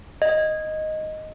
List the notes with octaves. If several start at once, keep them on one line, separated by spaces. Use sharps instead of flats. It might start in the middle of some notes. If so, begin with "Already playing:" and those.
D#5